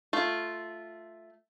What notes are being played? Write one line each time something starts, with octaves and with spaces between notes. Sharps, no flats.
A3 F4